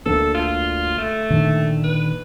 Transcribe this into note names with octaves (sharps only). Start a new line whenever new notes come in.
D2 D3 A#3 A4
F4
A3
A#2 D3 D#3
B4